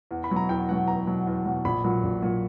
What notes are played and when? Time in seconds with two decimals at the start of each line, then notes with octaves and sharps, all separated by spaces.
0.11 E2
0.24 B5
0.30 B2 F#3
0.36 A#5
0.49 E2 G5
0.69 B2 F#3 F#5
0.88 E2 A#5
1.07 B2 F#3
1.27 E2
1.46 B2 F#3
1.65 A#1 B5
1.84 A#2 F#3
2.03 A#1
2.22 A#2 F#3